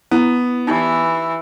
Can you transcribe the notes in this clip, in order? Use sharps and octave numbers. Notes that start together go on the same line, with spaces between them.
B3 E4
E3 D#4 G4 D5